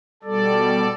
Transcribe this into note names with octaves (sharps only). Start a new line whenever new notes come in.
B2 G3 A4 D5